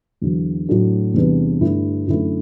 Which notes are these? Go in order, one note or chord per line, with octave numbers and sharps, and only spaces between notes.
E2 D3 F#3
A2 F#3 A3 D4
E2 C3 G3 B3 D4
G2 D3 A3 E4
F#2 D3 A3 E4